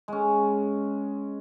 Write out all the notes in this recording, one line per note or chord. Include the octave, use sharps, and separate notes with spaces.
G#3 C#4